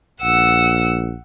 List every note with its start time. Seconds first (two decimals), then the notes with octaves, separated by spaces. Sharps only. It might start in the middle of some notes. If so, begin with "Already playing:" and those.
0.21 A#1 F#5 E6